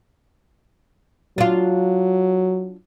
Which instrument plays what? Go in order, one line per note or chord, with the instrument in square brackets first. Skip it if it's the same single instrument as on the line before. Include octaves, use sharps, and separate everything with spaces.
[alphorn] F#3 [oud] D4 F4